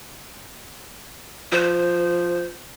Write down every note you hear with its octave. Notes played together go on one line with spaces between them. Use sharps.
F3 C5